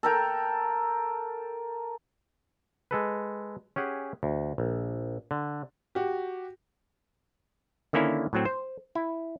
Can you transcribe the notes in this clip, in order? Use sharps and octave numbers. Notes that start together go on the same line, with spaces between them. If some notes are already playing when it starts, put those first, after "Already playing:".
A4 A#4 G5
G#3 A4 B4
C#4 G4 G#4 F#5
D2
A#1
D3
F#4 G4
D3 D#3 A#3 C#4 E4
A2 F#3 C4
C5
E4